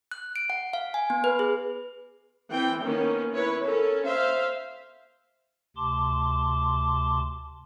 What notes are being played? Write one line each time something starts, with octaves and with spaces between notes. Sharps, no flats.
F#6
D7
F#5
F5
G#5
B3
B4
G#4
E3 C4 G5
D#3 A#3 B3 C#4
E4 B4 C#5
C#4 A4 A#4
C5 E5 F5
D2 C3 A5 C6 D6